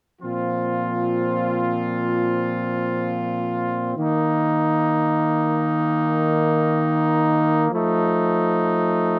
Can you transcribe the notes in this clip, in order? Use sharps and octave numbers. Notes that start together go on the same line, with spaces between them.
A#2 F3 C4 F4
D#3 A#3 D#4
F3 A3 D#4